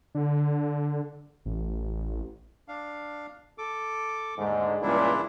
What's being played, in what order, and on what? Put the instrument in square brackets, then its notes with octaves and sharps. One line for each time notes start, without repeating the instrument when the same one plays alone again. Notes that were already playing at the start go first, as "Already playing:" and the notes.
[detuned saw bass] D3
A1
[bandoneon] D4 F5
A4 D6
[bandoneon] D#2 A3 [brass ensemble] G#2 D3
[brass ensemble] C#2 G2 A#2 [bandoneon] E3 D4 E4